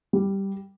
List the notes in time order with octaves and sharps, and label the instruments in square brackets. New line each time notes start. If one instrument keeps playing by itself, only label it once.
[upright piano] G3